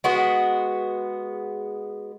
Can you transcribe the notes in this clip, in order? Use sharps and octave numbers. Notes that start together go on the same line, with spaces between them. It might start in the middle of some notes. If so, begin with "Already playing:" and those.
G#3 B3 F#4